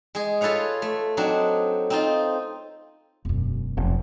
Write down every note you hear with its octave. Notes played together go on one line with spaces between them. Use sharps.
G#3 G#4
F4 A4 B4 C#5 F5
A3
F#3 C4 D4 D#4
C4 D#4 F4
E1 F#2
F1